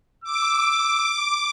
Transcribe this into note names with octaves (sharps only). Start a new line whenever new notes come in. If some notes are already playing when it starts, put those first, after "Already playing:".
D6 E6